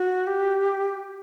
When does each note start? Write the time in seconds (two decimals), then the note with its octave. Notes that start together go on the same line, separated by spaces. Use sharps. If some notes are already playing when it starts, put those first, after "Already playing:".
Already playing: F#4
0.27 G4